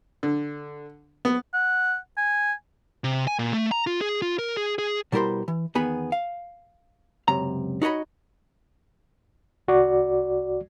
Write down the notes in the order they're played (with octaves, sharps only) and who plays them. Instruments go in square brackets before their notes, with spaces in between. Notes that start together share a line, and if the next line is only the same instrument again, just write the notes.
[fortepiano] D3
B3
[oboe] F#5
G#5
[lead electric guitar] C3
G#5
A#2
A3
A#5
F4
G#4
F4
A#4
G#4
G#4
[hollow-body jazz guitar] B2 G3 E4 A#4 C5 C6
E3
E2 D#3 B3 G#4 B5
F5
C#2 F#2 C3 A#5
D#4 F#4 C#5 D#5 B5
[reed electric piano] C2 F#4 D5